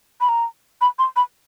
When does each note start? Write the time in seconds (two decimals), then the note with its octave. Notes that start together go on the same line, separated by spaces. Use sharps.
0.21 B5
0.29 A#5
0.81 B5
0.99 C6
1.16 B5